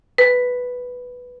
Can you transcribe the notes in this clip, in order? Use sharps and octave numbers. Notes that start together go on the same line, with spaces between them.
B4